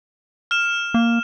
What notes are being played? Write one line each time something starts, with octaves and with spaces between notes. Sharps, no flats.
F6 E7
A#3